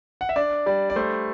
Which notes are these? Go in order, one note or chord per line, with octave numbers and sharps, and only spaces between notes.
F#5
E5
D4 D5
G3 D5
D5
A3 C5